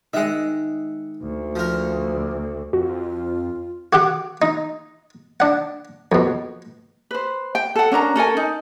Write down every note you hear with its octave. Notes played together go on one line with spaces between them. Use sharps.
D#3 G#3 E5 F#5
D2
F3 A#4
F2 F4 F#4
F#4 G4 F#5 D6
D#4
D4 F#5
F2 B2
B4 C5
G5
A4 F#5
C#4 D4 A#4 A#5
C#4 A4 A#4 G#5
D#4